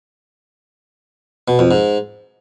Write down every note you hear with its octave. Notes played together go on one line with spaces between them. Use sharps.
B2
F2
G#2